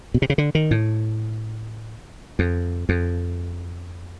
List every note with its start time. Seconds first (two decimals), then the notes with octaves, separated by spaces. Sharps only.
0.14 B2
0.22 C3
0.30 C#3
0.38 D3
0.55 D#3
0.71 A2
2.39 F2
2.89 F2